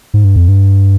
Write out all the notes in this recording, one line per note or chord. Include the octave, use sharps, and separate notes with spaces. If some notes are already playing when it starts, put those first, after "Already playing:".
G#2
G2
F2
G2